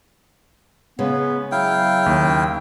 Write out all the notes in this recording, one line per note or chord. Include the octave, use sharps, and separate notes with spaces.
C#3 G#3 B3
F#3 E4 F5 G5
D#2